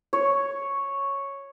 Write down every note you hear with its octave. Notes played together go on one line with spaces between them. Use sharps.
C#5